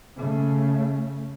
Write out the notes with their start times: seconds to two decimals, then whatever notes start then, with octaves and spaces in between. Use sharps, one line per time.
0.16 C#3 A3